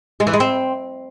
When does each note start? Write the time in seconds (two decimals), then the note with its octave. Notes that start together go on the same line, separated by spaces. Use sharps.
0.20 G#3
0.27 E3
0.33 G#3
0.40 C4